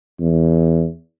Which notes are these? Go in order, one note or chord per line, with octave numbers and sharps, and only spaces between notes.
E2